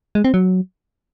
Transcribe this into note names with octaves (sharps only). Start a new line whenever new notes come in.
G#3
C4
F#3